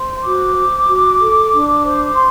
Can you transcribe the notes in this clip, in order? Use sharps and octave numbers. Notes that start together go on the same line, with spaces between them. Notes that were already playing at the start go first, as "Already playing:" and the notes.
Already playing: C5 C6
F#4 D6
C5
F#4
A4
D4
C5
C6